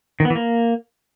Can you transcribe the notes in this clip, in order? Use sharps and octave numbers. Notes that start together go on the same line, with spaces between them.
D#3
B3
E3
A#3